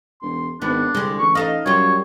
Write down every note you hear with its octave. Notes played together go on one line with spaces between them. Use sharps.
E1 C6
G#1 B3 D4
C2 D3 G#3
A1 C#6
D#4 A4 D#5 F5
F#2 G3 F4 C#5